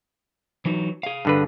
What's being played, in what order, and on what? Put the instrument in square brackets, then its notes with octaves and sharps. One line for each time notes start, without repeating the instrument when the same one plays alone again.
[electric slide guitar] E3 F#3 D#4
G#4 F5
[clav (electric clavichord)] G2 D3 B4